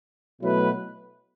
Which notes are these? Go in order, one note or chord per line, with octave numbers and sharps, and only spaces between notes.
B2 F#3 A3 E4 B4